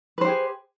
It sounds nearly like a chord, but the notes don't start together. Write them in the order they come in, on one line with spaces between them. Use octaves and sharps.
B4 C5 G4 G#4